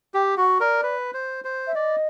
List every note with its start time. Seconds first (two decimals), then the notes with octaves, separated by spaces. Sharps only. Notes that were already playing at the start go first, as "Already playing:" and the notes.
0.14 G4 G5
0.37 F#4 F#5
0.60 A#4 D5
0.83 B4
1.14 C5
1.44 C5
1.67 E5
1.75 D5 D#5